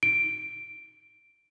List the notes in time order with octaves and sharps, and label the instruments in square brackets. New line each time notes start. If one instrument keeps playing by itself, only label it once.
[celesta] D7